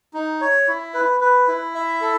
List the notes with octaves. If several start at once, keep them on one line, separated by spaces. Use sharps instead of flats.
D#4
C#5
E4
B4
B4
E4
E5
A4